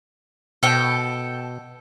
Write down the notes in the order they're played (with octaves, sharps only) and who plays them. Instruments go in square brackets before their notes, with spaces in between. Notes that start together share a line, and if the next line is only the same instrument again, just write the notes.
[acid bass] B2 [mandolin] A4 G5